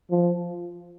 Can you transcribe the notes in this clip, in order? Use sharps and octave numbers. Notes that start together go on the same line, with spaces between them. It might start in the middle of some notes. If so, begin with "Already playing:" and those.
F3